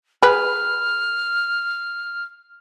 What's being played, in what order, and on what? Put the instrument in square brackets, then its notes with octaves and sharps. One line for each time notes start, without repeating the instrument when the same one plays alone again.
[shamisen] G#4 B4 [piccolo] F6